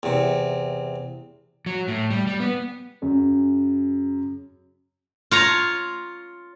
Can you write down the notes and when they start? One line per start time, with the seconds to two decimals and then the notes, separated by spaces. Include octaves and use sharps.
0.03 E2 C3
1.66 F#3
1.88 A2
2.11 G3
2.27 G3
2.40 B3
3.02 F#2 C#3
5.31 F4 C#5 A#5